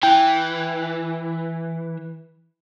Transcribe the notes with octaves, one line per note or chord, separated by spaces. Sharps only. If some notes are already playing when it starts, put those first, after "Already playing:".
E3 G5